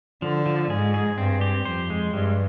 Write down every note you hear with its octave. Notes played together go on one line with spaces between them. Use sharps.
D3 F3
F3
G#2 G#4
G#4
G2 C4
G4
F2 C5
G#3
G2 G3